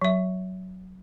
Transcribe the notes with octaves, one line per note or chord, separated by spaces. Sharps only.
F#3 E5